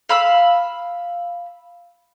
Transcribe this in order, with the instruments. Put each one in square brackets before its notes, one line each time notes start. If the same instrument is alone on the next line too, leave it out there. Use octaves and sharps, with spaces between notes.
[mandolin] F5 B5 E6